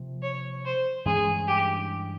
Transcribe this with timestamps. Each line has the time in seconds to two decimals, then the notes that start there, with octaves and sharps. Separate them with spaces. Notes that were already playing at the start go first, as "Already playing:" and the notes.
Already playing: C3 F3 A#3
0.23 C#5
0.65 C5
1.05 G2 E3 G#3 C#4 G#4
1.47 G4